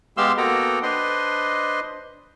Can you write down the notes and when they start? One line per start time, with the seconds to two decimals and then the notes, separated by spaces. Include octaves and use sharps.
0.17 G#3 B3 G4 F5 C6 E6
0.37 A#3 B3 F#4 A4 G5 A#5
0.83 D4 B4 C5 D#5 C6